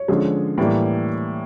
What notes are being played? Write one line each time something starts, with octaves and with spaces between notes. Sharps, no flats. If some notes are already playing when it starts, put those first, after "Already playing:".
Already playing: C#5
D3 F3 G#3 C#4
A2 E3 G3 A#3